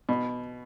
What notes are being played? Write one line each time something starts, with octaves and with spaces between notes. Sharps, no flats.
B2